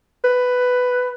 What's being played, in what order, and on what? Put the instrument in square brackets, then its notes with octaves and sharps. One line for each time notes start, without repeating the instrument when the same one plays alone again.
[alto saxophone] B4